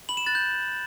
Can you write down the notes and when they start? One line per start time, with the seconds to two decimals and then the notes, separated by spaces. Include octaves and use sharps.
0.09 B5 F#7
0.17 E7
0.27 F#6 A6
0.35 G6